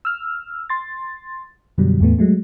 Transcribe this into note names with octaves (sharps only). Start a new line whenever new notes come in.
E6 F6
C6 A6
F#2 B2 D3 F#3 G3
E2 A2 A3 B3
F#3 G#3 A3